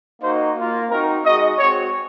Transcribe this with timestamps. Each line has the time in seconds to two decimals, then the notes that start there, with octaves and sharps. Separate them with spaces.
0.22 A#3 D#4 F#4 C5
0.57 A#3 F4
0.91 C4 D#4 F#4 A#4
1.25 G#3 D#4 F#4 D#5
1.59 G#3 C4 F#4 C#5